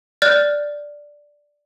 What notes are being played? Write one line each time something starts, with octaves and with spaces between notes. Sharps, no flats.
D5 F6 F#6 A6